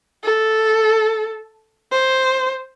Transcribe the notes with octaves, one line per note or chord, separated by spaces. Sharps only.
A4
C5